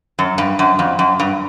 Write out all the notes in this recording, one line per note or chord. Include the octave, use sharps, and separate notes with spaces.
F#2
G2
F#2
F2
F#2
G2